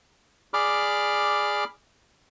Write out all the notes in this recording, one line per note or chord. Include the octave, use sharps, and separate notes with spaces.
G#4 D5 B5 D6 F6